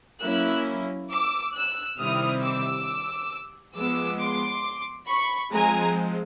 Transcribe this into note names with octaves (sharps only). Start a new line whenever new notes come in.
F#3 A#3 C#4 E4 E6 F#6
D6 E6
E6 F#6
C3 D#3 G3 C4 E4 D#6 F6
D6 E6
F3 G#3 B3 D6 E6
C6 D6
B5 C#6
F3 G#3 C4 G#5 A#5